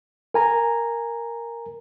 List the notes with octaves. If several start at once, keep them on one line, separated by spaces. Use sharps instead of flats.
A#4 G#5 A#5